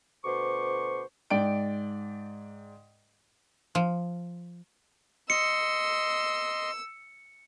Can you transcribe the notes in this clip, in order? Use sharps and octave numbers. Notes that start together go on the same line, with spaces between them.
D2 B2 C5 C#6 D6
G#2 D5 G5 D7
F3
D#5 C6 E6 C#7